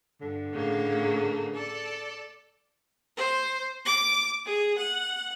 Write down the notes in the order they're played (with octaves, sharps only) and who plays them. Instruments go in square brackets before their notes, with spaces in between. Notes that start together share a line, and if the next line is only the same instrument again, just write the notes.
[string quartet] G2 [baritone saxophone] D3
[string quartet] A2 C#3 A#3
A4 D5
[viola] C5
D6
G#4
F#5